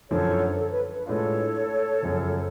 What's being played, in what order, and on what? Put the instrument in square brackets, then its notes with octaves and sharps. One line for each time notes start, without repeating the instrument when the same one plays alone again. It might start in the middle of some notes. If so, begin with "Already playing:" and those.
[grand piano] F#2 D3 F3 [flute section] A4 C#5
[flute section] B4
A4
B4
B4
[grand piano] A2 G#3 D4 F4 [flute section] A4 C#5
[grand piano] F#2 C#3 F3